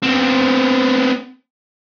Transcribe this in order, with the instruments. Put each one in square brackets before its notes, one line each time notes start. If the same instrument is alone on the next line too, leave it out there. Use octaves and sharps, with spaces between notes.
[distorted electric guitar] B3 C4